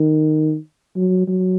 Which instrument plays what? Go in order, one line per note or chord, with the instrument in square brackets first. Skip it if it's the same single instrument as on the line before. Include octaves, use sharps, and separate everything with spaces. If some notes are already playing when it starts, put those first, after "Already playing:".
Already playing: [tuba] D#3
F#3
F#3